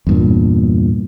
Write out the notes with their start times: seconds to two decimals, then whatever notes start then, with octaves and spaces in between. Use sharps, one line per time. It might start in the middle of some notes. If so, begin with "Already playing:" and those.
0.07 E2 G2 A#2